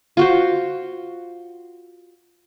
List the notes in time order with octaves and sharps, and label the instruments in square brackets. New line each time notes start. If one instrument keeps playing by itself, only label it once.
[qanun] F4 F#4 C5